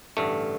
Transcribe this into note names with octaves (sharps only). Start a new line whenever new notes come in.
A1 G2 D3 A3